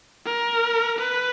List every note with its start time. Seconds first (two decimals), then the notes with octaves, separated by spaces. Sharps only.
0.26 A#4
0.99 B4